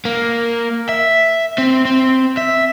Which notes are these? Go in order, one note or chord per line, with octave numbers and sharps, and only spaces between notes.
A#3
E5
C4
C4
E5